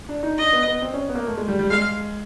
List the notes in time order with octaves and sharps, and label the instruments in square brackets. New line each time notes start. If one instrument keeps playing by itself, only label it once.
[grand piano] D4
D#4
[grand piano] D4 [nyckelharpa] D#5
[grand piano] B3
B3
C4
C#4
B3
A#3
A3
G#3
G3
G3
[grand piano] G#3 [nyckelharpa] F5